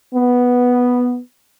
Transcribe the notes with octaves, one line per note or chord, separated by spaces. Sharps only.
B3